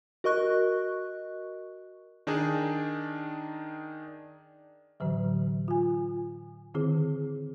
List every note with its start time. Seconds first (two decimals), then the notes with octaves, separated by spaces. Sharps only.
0.24 F#4 A#4 D#5 C#6 F#6
2.27 D#3 D4 D#4 G#4 D5
5.00 A2 D3 E3 F#3
5.68 F4 G#5
6.74 D3 D#3 C4 E4 G#4